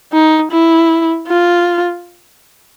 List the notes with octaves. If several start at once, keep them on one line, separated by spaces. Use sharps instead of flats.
D#4
E4
F4